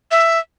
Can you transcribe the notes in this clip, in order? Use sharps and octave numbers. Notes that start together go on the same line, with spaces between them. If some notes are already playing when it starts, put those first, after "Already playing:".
E5